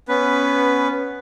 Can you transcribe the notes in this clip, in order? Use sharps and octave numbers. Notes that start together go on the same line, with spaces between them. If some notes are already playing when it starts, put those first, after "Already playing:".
B3 C#4 B4